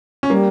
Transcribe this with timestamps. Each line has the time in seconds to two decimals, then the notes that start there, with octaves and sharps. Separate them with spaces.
0.23 C#4
0.30 G3 A#3